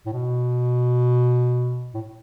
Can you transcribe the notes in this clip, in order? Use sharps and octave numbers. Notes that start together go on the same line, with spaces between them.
A2
B2
A2